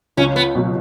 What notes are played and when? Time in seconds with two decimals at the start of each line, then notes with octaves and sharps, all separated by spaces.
0.17 C#2 C#4
0.36 B3
0.55 B2 F#3